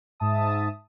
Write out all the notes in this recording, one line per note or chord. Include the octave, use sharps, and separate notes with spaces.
G#2 E5 A5 D#6